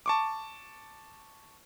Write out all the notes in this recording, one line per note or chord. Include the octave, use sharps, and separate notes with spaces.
A5 C#6 D6